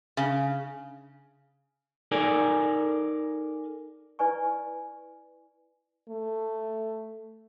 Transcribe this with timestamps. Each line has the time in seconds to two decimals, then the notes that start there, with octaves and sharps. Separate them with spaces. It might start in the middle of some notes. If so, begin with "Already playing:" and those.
0.17 C#3
2.12 D#4 A4 A#4 D5 G#5
4.19 E4 B4 D5 G#5 C#6
6.09 A3